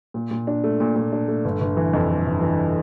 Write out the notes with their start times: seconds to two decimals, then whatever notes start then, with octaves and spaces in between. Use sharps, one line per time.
0.14 A#2
0.31 A#2
0.47 D4
0.64 A3
0.80 A#2
0.96 A#2
1.12 D4
1.28 A3
1.44 G1
1.61 G1
1.77 E3
1.93 F2
2.09 G1
2.26 G1
2.41 E3